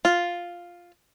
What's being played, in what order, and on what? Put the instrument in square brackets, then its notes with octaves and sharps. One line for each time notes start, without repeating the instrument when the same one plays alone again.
[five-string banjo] F4